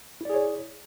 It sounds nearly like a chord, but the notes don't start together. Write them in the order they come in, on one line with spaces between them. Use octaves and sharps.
E4 D5 G#4 C#5